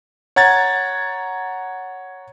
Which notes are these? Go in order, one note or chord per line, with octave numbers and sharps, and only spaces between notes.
C#5 F#5 A#5 G#6 A6